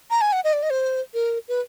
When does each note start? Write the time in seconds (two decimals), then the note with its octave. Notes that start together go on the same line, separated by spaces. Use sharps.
0.10 A#5
0.21 G#5
0.33 F#5
0.44 D#5
0.53 D5
0.63 D#5
0.70 C5
1.14 A#4
1.48 B4